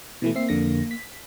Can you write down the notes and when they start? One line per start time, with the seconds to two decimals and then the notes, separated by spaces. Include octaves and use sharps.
0.22 B2 E3 A3 E4
0.35 A#3 C4 E5 C7
0.49 F2 D3 A#6
0.91 B6